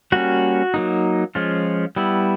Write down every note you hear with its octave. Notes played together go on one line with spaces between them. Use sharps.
G3 A#3 C#4 F#4
F#3 A#3 D#4
F3 G#3 C#4 F4
G3 B3 E4